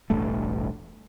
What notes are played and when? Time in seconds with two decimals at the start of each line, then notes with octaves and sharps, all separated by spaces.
0.10 E1 A1 G2 A3